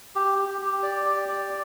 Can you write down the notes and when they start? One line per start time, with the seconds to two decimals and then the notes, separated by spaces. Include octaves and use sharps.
0.16 G4
0.39 G4
0.61 G4
0.83 D5
1.06 G4
1.29 D5